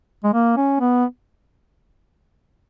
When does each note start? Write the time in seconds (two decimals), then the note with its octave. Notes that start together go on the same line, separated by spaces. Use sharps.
0.24 G#3
0.33 A#3
0.57 C#4
0.80 B3